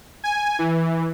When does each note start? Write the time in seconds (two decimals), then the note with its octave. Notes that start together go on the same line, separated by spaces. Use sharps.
0.24 G#5
0.59 E3